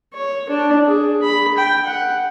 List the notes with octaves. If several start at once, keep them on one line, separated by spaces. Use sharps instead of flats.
C#5
D4
G#4
B5
G5
F#5